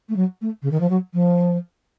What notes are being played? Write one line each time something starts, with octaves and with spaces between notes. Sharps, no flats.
A3
F#3
A3
C#3
D#3
F3
F#3
F3